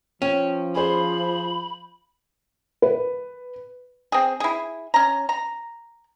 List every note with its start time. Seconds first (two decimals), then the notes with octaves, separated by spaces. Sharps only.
0.22 F3 C#4 G5
0.75 G#4 C5 B5
2.82 B4
4.12 C4 G#4
4.40 E4 G#4
4.94 C#4 A#5
5.29 A#5